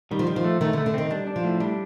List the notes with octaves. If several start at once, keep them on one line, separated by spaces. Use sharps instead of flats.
D#3 G3
F3
D#3 G3
F3
A3
D#3 A3
D3
A3
D3
D#3 C4
G3 D4
D4
F3
A2
G3 D4